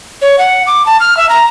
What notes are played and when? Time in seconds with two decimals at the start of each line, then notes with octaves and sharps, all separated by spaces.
0.22 C#5
0.38 F#5
0.67 D6
0.86 A5
1.00 F6
1.17 E5
1.29 A#5